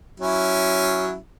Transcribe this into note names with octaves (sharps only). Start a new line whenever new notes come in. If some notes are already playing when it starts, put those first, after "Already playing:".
F#3 C#4 E4